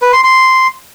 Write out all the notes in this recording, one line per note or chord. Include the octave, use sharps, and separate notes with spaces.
B4
C6
C6